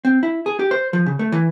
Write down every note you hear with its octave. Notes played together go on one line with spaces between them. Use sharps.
C4
E4
G#4
G4
C5
F3
C#3
A3
E3